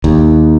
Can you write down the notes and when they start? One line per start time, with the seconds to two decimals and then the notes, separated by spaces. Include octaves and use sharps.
0.04 D#2